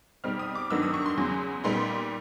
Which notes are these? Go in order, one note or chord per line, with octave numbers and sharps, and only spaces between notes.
B2 G3 C4 D#4 F6
D#6
D6
G2 D#3 F#3 B3 D#4 E6
D#6
C#6
C6
E2 C#3 F#3
A#2 G3 B3 D#4 C6